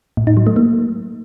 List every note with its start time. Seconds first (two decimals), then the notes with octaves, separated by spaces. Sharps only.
0.17 A2
0.27 D#4
0.37 F#3
0.47 A3
0.56 A#3